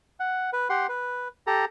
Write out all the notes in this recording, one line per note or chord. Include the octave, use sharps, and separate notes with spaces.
F#5
B4
G4 F#5 C6
B4
G4 A4 A#5